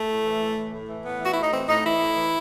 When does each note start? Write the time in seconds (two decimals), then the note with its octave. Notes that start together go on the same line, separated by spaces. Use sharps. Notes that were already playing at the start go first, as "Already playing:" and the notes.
Already playing: A3
0.09 A2
0.26 E3
0.41 A2
0.57 E3
0.73 A2
0.89 E3
1.05 A2 B3
1.21 E3 F#4
1.33 A2 E4
1.43 D#4
1.52 E3 C4
1.69 A2 D#4
1.85 E3 E4
2.01 A2
2.16 E3